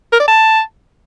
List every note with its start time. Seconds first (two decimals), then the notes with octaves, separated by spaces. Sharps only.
0.12 A#4
0.20 D5
0.28 A5